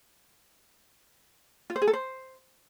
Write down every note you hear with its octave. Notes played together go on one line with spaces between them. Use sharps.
F4
C5
G#4
A4
C5